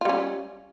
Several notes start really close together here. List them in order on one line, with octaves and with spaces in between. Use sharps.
F4 G3 C#4